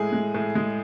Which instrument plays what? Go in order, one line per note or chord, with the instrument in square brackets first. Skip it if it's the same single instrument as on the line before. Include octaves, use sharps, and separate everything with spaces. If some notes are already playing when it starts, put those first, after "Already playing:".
Already playing: [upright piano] A2 G#3 G#4
G#3
A2
G#3